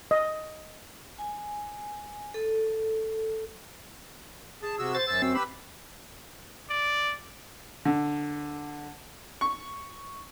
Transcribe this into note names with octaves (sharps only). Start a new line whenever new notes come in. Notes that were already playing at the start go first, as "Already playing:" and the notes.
D#5
G#5
A4
G#4 A5
C3 F#4 E6
C5 A6
F#2 C5 E6
C4 F#4
G4 B4 B5 E6
D5
D3
C#6